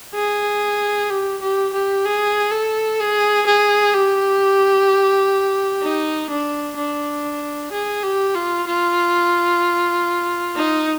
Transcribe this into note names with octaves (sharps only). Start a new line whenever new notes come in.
G#4
G4
G4
G4
G#4
A4
G#4
G#4
G4
D#4
D4
D4
G#4
G4
F4
F4
D#4